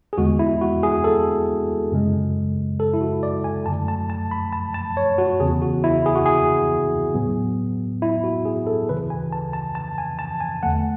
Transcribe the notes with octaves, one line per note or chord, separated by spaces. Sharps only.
G#4
E2 D3 G#3 B3 F#4
E4
F#4
G#4
A4
F#2 C#3 G#3
A4
E4
F#4
D5
G#5
F#2 D3 F#3 A3 A5
A5
A5
B5
A5
A5
C#5
F#4
E2 C#3 E3 B3 G#4
F#4
E4
G#4
F#4
G#4
A2 F#3 B3
E4
F#4
G#4
A4
D2 C#3 E3 B4
G#5
A5
A5
A5
G#5
A5
G#5
E2 D3 A3 F#5